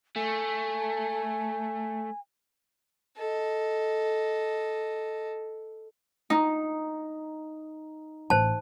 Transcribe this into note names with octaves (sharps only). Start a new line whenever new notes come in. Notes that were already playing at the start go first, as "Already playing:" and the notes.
A3 G#5
A4 D#5
D#4
A1 C5 A5